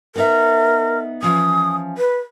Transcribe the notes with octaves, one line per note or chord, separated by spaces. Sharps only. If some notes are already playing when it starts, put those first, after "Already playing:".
B3 D#4 A#4 E5
E3 F3 C#4 D#6
B4